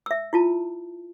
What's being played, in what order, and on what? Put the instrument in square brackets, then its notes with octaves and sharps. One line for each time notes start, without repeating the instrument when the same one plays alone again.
[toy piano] E5 E6
E4 F4 A5